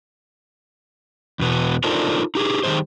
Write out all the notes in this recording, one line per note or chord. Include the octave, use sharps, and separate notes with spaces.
E2 B2 B3
D4 D#4 F4 A4 A#4 C5
D#4 G4 G#4
D#3 G3 C#4 G#4 C5